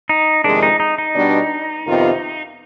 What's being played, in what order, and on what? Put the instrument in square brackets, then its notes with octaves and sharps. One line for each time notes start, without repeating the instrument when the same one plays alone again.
[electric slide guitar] D#4
[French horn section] F2 C3 D#3 G#3 [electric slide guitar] D4
[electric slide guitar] D#4
D#4
D#4
[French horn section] B2 G3 B3 D4
F2 C3 D#3 B3 F4